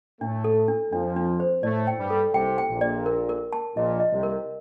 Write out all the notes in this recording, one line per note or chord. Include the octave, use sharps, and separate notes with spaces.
A2 A3 D4
A4
D4
F2 F3 D4
D4
C5
A2 A3 D5
G5
G2 G3
A4
C2 C3 G5
G5
A#1 A#2
D5
A#4
A#4
A5
A#1 A#2 D#5
D#5
C2 C3
A#4